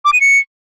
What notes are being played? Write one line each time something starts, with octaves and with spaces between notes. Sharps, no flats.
D6
D#7
C#7